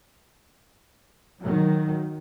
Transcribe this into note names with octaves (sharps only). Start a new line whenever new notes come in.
D#3 F#3